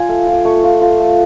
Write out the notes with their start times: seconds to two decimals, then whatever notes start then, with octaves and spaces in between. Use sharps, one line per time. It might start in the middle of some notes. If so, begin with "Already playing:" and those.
Already playing: F4 G#5
0.09 A3
0.27 F4
0.33 D6
0.45 A3 C#6
0.64 F4
0.81 F4
1.00 A3